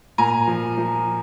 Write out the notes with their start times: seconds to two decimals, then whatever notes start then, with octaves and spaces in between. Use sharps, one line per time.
0.18 A#2 G#5 A#5
0.48 F3
0.78 F3